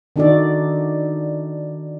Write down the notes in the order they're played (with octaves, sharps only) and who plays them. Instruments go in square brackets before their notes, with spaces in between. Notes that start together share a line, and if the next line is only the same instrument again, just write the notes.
[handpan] D#3 D4 D#4 F#4 A4 D5